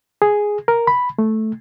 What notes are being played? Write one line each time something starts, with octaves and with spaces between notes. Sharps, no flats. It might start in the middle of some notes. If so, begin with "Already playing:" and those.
G#4
A#4
B5
A3